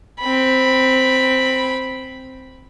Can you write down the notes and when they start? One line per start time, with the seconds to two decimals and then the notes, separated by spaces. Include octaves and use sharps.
0.20 C4 B5